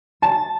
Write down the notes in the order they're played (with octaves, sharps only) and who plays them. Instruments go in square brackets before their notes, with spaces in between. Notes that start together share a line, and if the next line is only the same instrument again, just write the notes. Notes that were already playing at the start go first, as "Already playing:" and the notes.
[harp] A5